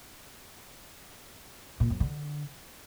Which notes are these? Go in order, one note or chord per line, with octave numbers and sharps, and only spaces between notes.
A#2
F#2
D3